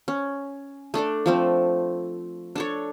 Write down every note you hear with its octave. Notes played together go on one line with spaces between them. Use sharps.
C#4
A3 D4 A4 D5
F3 A3 C4
D4 A4 C#5